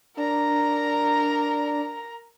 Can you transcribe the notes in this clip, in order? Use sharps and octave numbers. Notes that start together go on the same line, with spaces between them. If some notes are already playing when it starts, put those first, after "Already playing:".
D4 A#4 A#5